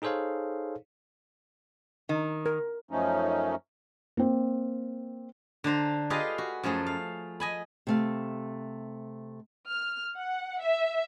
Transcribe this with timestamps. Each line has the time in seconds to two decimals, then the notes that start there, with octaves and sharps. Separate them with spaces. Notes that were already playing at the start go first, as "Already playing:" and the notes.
0.02 D#4 G#4 A4 C5 C#5 F5
2.09 D#3
2.46 A#4
2.91 F#2 F3 A3 C#4 D#4
4.17 A#3 C4
5.64 D3 D4 C5 A#5
6.10 F4 G4 G#4 B4 D#5 F5
6.38 F#4
6.63 F#2 F3 A3 G#4
6.86 F5
7.40 D#5 G#5 B5
7.87 C3 A3 F5
9.68 F6
10.17 F#5
10.61 E5